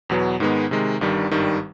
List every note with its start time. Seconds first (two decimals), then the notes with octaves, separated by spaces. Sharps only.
0.09 E2 B2 F#3 B3
0.40 G#2 D#3 G#3 B3
0.71 C3 D#3 G#3
1.01 G1 G2 D#3 G3
1.31 G#1 G2 D#3 G3